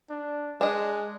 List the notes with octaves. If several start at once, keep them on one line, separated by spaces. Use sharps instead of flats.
D4
G#3 D4 D#5